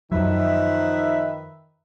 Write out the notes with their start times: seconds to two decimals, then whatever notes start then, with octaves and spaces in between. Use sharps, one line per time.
0.12 F#2 D#3 F3 F#3 B4 E5